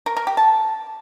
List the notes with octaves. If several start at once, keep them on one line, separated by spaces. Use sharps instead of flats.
A#4
A#4
G4
A5